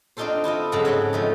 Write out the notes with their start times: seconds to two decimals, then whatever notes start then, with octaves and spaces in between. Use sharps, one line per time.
0.17 C4 D4 D#4 F4 A4 C5
0.44 E4 F4 A4 D#5
0.72 F2 G#2 C#3 F#3 A4
0.85 C4 C#5 F#5 B5 C6
1.13 F3 A3 D#4